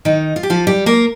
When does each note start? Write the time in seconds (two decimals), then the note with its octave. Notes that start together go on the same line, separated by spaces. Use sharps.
0.05 D#3 D#4
0.36 F4
0.43 G4
0.50 F3 F4
0.67 G3 G4
0.86 A#3 A#4